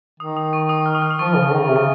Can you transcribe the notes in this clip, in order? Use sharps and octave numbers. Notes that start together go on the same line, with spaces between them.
D#3 D#6
D#6
C#6
D#6
F6
D#6
F6
D#6
F3 C#6
C#3
D#3
C#3
C3
C#3 C#6